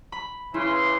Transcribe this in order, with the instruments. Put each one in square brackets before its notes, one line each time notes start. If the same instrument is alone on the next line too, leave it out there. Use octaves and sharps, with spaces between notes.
[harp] B5
[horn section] C#3 E3 C6 [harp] E4